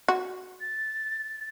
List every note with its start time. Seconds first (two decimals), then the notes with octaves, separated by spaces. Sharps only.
0.08 F#4
0.61 A6